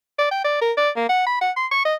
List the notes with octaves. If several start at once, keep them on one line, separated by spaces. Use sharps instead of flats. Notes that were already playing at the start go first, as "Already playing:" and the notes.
D5
G5
D5
A#4
D5
A#3
F#5
B5
F#5
C6
C#6
D#5